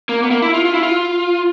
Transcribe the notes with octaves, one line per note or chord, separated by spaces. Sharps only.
A#3
B3
A#3
E4
F4
F4
E4
F4